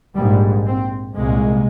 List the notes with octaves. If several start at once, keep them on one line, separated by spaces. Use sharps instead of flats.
A#1 G#2 G3
C4
C2 A#2 G#3